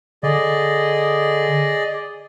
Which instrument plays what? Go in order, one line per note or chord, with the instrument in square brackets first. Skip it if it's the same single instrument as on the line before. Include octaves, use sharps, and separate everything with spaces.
[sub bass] D3 [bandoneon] G#4 D5 D#5